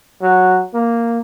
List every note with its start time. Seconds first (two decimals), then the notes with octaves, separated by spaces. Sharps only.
0.22 F#3
0.74 A#3